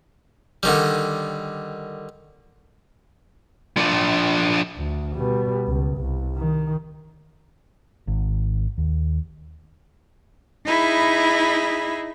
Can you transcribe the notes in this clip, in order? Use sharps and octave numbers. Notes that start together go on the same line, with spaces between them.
D3 D#3 G3
F3 D4
D2
B2 G3
C#2
C2
D#3
G#1
D#2
D#4 E4 G#4 B5